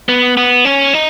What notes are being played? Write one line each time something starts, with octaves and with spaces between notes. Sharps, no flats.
B3
B3
C#4
D#4